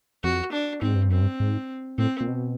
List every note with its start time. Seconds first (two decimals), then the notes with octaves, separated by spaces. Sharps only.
0.23 F2 F#4
0.52 D4
0.82 G#2 C4
0.95 G2
1.09 F#2 C4
1.22 G2
1.40 G#2
1.98 A2 C4
2.21 A#2
2.28 B2